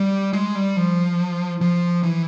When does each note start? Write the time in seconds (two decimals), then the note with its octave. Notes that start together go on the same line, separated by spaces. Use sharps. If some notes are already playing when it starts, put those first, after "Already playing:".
Already playing: G3
0.33 G#3
0.55 G3
0.77 F3
1.61 F3
2.03 E3